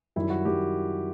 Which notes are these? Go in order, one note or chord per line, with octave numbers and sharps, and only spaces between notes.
F#2 D#3 G3 E4
F#4
F#2 D#3 G3 G4